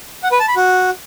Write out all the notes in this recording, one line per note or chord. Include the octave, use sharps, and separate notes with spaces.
F#5
B4
A5
B5
F#4